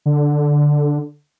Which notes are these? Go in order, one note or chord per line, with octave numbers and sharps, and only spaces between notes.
D3